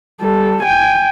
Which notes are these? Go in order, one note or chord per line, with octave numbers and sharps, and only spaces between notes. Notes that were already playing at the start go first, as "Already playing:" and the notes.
G3 A4
G5 G#5